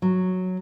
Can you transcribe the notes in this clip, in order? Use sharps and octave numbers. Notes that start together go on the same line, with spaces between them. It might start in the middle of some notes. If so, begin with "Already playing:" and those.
F#3